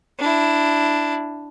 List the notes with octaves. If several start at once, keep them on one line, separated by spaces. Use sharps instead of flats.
D4 E4